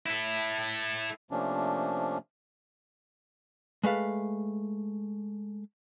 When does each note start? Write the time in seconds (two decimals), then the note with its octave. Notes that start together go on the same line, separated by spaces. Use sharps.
0.06 E4 A4
1.31 C3 F3 A3 A#3 C#4 D4
3.84 G#3 A3 B4 F5